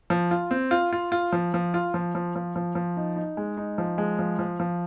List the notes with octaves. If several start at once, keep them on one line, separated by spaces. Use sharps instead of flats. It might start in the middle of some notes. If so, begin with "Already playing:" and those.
F3
F4
C4
F4
F4
F4
F3
F3
F4
F3
F3
F3
F3
F3
D#4
D#4
G#3
D#4
F3
G#3
F3
F3
F3